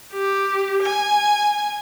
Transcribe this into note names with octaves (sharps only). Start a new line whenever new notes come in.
G4
G#5